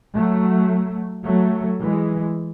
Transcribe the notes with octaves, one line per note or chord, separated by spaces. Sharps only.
F#3 A3
F#3 A3
E3 G#3